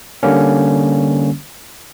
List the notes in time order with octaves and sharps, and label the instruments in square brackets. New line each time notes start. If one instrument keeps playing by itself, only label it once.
[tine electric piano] D3 G3 A#3 C#4